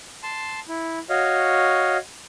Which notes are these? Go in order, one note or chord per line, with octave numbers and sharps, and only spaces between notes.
A5 C6
E4
F#4 C#5 D#5 F5